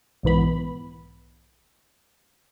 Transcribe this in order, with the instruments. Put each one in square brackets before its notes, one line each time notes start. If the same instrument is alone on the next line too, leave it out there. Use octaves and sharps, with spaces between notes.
[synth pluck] B1 G#2 E3 B3 B5